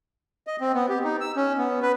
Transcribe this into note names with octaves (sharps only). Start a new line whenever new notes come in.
D#5
C4
B3
G4
D#4
E6
C#4
B3
B4